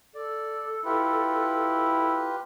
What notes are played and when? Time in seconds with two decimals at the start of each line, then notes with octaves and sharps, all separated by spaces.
0.15 A4 D5
0.85 E4 F4 G4 B4